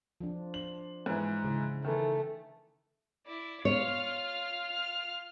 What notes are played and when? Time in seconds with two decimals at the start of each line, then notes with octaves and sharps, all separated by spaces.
0.20 F3 D4
0.54 D4 F#7
1.06 G#2 E3
1.44 C#3 E4
1.84 D#3 E3 A3
3.27 E4 D5
3.65 F4 C#5 F6